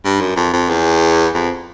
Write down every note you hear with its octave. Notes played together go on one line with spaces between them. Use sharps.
G2
F#2
F2
F2
E2
F2